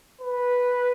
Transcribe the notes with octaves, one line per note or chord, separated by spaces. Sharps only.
B4